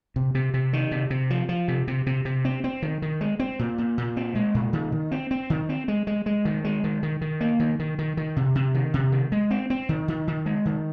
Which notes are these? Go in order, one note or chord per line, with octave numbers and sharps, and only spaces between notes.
C3
C3
C3
D#3
C3
C3
F3
F3
C3
C3
C3
C3
C4
C4
D#3
D#3
G#3
C4
A#2
A#2
A#2
C4
G#3
A#2
D#3
D#3
C4
C4
D#3
C4
G#3
G#3
G#3
D#3
G#3
D#3
D#3
D#3
A#3
D#3
D#3
D#3
D#3
C3
C3
D#3
C3
D#3
G#3
C4
C4
D#3
D#3
D#3
G#3
D#3